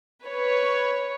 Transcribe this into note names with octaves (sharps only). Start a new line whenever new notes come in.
B4 C#5